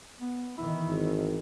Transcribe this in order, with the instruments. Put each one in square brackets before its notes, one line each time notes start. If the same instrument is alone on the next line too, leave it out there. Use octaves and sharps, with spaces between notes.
[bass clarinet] B3
[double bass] D#3 E3 [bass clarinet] E4
[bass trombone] G#1